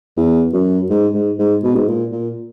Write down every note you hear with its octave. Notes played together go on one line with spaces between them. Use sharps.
E2
F#2
G#2
G#2
G#2
B2
G#2
A#2
A#2